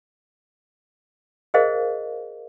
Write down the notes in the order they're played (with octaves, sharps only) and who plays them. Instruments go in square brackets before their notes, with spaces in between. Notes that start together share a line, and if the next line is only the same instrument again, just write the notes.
[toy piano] G#4 A#4 C5 D#5 F5